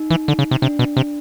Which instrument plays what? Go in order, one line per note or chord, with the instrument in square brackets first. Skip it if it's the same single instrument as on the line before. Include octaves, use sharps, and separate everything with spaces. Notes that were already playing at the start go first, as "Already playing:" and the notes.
Already playing: [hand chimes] D#4
[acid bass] E3
D3
C#3
C3
[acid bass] C3 [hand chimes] D4
[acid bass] B2
C3